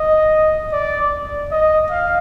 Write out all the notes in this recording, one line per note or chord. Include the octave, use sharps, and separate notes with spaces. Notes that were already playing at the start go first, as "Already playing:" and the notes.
Already playing: D#5
D5
D#5
F5